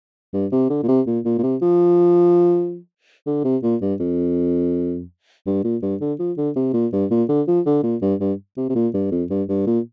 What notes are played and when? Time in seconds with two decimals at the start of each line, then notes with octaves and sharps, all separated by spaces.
0.33 G2
0.52 C3
0.70 D3
0.83 A#2
0.88 C3
1.07 A#2
1.25 A#2
1.38 A#2
1.43 C3
1.62 F3
3.27 D3
3.44 C3
3.63 A#2
3.81 G2
4.00 F2
5.47 G2
5.64 A#2
5.82 G2
6.01 D3
6.19 F3
6.37 D3
6.56 C3
6.74 A#2
6.93 G2
7.11 A#2
7.29 D3
7.48 F3
7.66 D3
7.83 A#2
8.02 G2
8.20 G2
8.57 C3
8.70 C3
8.75 A#2
8.94 G2
9.12 F2
9.30 G2
9.49 G2
9.67 A#2